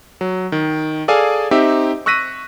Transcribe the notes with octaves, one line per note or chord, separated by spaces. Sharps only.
F#3
D#3
G#4 A4 D5 F5 G#5
C4 D#4 G4 E5
C#6 E6 F#6 A#6 B6 D#7